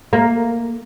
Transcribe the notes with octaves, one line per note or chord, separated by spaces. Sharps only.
A#3